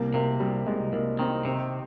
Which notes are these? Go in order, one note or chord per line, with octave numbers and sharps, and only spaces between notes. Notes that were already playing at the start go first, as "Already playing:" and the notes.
Already playing: C2 A#3
C3 A#3
C2 G3
C2 G#3
C2 A#3
D#3 C4
C3 C4